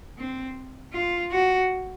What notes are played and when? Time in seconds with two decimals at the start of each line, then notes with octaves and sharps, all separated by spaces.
0.18 C4
0.93 F4
1.32 F#4